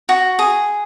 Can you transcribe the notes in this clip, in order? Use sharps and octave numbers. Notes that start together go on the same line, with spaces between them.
F#4
G#4